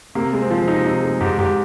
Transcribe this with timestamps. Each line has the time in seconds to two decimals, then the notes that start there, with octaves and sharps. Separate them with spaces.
0.15 C3 A#3
0.33 G#3
0.42 C4
0.50 F3
0.67 C3 D#4
0.85 C3 D#4
1.03 G#3
1.20 G#2 G4
1.38 G#2 G4